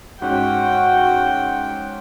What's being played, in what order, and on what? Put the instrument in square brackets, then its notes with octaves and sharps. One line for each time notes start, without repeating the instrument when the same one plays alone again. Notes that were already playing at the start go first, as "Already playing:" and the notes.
[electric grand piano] G#2 C#4 [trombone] F#4 [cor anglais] F#5 [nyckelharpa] G5